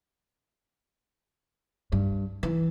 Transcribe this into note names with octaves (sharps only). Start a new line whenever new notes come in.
G2
E3